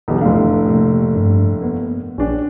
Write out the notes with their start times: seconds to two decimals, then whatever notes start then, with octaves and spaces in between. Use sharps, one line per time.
0.08 B1 E2 G3
0.21 F1 A2 D4 F5
0.68 C3 A3 A#3
1.16 G2 D4
1.61 A#3 B3
2.18 A#1 C#4 D4 G5